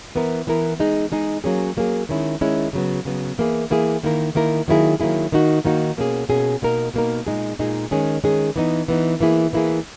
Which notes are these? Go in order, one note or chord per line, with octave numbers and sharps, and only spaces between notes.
E3 B3 E4 A#4
E3 B3 E4 A#4
G#3 D#4 G#4
G#3 D#4 G#4
F#3 A#3 C#4 G#4
F#3 A#3 C#4 G#4
D#3 G#3 C#4 E4
D#3 G#3 C#4 E4
C#3 F#3 B3
C#3 F#3 B3
E3 A#3 E4 G#4
E3 A#3 E4 G#4
D#3 A#3 E4 A#4
D#3 A#3 E4 A#4
D#3 F#3 A#3 E4 G#4
D#3 F#3 A#3 E4 G#4
D#3 A#3 D#4 F#4
D#3 A#3 D#4 F#4
B2 A#3 C#4 G#4
B2 A#3 C#4 G#4
B2 A#3 D#4 A#4
B2 A#3 D#4 A#4
A#2 G#3 D#4 G#4
A#2 G#3 D#4 G#4
D#3 G#3 C#4 G#4
D#3 G#3 C#4 G#4
E3 B3 D#4
E3 B3 D#4
E3 A#3 E4 G#4
E3 A#3 E4 G#4